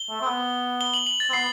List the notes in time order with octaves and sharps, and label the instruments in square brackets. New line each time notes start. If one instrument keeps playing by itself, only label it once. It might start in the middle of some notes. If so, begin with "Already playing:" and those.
Already playing: [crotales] G7
[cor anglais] A3
C4
B3
[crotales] G7
F#7
F#7
A6
[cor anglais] C4
[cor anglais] B3 [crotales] C7